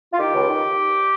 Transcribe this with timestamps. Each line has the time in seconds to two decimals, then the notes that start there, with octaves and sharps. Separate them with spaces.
0.12 F4
0.19 D#3 G4
0.34 C#2
0.49 D#3